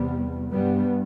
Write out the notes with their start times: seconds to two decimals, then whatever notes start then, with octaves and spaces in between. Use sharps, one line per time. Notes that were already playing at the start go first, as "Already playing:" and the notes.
Already playing: E2 C3 G3 B3
0.53 G2 G3 B3